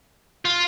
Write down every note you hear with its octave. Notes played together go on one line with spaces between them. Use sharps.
F4